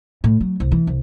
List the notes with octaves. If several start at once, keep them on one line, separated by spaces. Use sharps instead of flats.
A2
F#3
C2
E3
C2